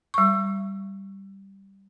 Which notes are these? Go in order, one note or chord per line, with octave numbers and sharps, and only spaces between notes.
G3 C#6